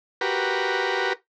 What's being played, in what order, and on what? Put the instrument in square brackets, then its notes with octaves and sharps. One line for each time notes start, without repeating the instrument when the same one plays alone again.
[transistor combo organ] F#4 G4 A#4 B4